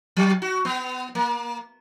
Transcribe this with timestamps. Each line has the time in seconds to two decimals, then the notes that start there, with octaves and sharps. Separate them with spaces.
0.17 F#3
0.42 F#4
0.65 B3
1.15 A#3